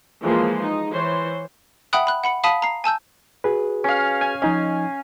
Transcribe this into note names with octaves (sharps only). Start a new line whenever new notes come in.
E3 F3 G#3 A#3 G#4 C6
D#4
E3 C5 C#5 C6
E5 F#5 G5 B5 D#6 F#6
B5 F#6
F#5 B5 C#7
F5 A5 B5 D#6 B6 D#7
A#5 C7
G#5 A5 E6 G6
F#4 G#4 B4
C#4 F5
G#5
F3 C#4 D#4 D#5